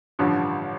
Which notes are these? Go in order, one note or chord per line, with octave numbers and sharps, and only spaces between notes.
A1 G2 D3 F3